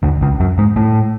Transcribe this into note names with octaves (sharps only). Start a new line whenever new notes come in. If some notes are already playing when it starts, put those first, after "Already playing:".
D2 D3
C#2 C#3
F#2 F#3
G#2 G#3
A2 A3